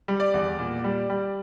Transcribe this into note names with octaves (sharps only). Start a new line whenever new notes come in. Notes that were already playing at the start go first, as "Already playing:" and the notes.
G3
D5
E2
A#2
G3
G3